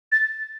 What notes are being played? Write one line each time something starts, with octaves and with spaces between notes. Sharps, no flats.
A6